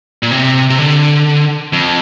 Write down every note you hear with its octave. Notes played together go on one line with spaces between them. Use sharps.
A#2
C3
C3
D3
F2